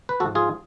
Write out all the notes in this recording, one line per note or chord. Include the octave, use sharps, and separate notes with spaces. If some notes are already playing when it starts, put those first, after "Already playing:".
B4
G#2 F3 F#4 A4
F4 G#4